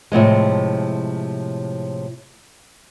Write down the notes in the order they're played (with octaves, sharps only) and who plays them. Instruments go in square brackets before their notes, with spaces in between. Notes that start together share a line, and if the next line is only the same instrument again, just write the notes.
[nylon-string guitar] A2 C3 F3 G#3